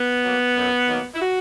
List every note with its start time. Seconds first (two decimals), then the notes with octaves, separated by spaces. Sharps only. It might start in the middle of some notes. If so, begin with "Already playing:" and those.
Already playing: B3
0.25 F#3 A#3
0.57 F#2
0.89 D#3 F#3 A#3
1.14 E4
1.21 F#4